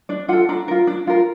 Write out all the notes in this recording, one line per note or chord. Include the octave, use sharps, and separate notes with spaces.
D4 D5
F4 A4 F#5
D4 A#5
F4 A#4
D4
F4 A#4